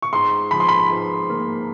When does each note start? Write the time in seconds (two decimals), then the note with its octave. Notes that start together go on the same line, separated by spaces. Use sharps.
0.02 C#6
0.13 G#2 C6
0.51 F3 B5
0.60 C6
0.68 B5
0.90 G#2
1.30 A#3